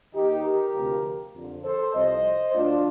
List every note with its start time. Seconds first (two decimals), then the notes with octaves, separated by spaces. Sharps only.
0.13 D#2 D#3 D#4 G4
0.44 G4 A#4
0.74 D2 C3 F3
1.33 F2 D3 F3
1.63 A4 C5
1.93 C2 C3 F3 C5 D#5
2.53 D2 D3 F3 D4 F4